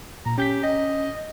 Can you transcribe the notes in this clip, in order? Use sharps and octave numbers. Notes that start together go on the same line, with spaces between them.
A#2 A#5
C#4 G4 G6 B6
D#5